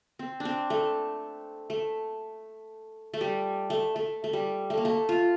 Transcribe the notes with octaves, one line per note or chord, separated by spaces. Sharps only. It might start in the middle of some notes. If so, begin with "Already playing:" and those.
C4
D4
C4
A3
A3
A3
G3
A3
A3
A3
G3
A3
A#3
A3
F4